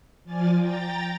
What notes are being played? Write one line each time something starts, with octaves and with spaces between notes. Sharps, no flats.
F3 F4 D5 G#5 A6
G5 A#5 A6